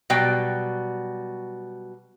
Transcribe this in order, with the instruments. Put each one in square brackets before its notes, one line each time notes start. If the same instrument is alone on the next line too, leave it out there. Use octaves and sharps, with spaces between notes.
[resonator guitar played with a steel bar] B2 F#3 G3 D5 G5